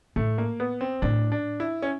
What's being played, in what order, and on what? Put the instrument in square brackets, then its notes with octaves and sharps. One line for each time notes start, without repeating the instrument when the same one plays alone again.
[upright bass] A2 [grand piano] A3
[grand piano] A#3
B3
C4
[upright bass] A2 [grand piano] D4
[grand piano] D4
E4
C#4